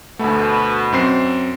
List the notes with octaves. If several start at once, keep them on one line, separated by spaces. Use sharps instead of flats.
D2 B2 A3
F#2 C4 C7